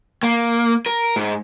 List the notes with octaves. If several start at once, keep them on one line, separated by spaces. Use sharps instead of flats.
A#3
A#4
G#2